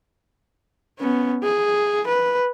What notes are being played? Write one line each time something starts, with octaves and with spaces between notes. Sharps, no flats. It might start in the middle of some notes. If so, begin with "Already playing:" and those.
B3 C#4
G#4
B4